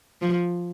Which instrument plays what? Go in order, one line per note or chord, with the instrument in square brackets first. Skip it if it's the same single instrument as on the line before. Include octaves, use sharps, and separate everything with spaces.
[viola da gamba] F3